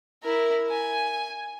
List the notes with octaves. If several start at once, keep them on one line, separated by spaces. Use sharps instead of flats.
E4 A#4
G#5